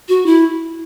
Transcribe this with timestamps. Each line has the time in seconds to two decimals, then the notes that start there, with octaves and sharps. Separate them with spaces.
0.09 F#4
0.26 E4